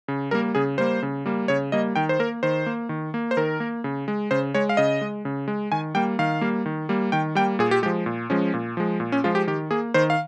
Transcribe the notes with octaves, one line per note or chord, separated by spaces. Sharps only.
C#3
G3 A#3 A#4
C#3 G#4
G3 A#3 C5
C#3
G3 A#3
C#3 C#5
G3 A#3 D#5
D#3 G5
C5
A#3 A#4
D#3 C5
A#3
D#3
A#3
C5
D#3 A#4
A#3
C#3
G#3
C#3 C5
G#3 C#5
F5
C#3 D#5
G#3
C#3
G#3
D#3 G#5
G3 A#3 G5
D#3 F5
G3 A#3
D#3
G3 A#3
D#3 G5
G3 A#3 G5
A#2 G#4
G4
F3 G#3 G4
A#2
F3 G#3 C#4
A#2
F3 G#3
A#2
C#4
F3 G#3 F4
G4
D#3 G4
A#3 G#4
D#3 C5
F5